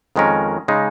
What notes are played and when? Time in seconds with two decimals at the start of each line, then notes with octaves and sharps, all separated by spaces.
0.16 F2 D#3 G#3 C#4 A#4
0.68 C#3 G#3 D#4